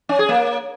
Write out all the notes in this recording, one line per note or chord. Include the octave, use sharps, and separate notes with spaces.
C#4
G#4
A#3